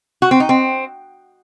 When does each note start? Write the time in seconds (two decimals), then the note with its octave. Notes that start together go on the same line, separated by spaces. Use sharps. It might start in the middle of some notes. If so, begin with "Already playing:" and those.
0.22 F#4
0.31 C4
0.40 D#4
0.49 C4